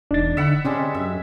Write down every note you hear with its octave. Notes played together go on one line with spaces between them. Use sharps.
E1 D4 D#4 A6
D3 E5 F#5 B5
C3 G3 G#3 C#4 D4
F#2 E5